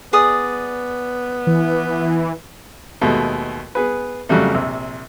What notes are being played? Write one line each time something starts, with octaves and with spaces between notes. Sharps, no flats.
B3 G#4 D5 D#6
E3
D#2 B2 G#3 A3
B3 G#4 B4
F2 C#3 F#3 G3 A3
A#1 C3 E6